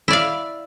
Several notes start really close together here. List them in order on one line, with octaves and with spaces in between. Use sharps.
E4 D5 F5